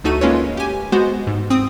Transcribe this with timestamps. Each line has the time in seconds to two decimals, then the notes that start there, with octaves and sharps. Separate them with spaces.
0.04 D2 A3 D#4 F#4 A4 D#7
0.21 G#3 A#3 C#4 F4 B4 C#5
0.57 G4 G#5
0.92 G#3 B3 F#4 C5
1.27 G#2
1.50 C4 D#6